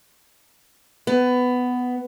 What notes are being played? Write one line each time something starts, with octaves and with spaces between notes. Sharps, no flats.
B3